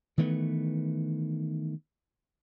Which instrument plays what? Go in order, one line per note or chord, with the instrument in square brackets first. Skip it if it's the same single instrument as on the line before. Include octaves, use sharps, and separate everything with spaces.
[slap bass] D#3 E3 A3 B3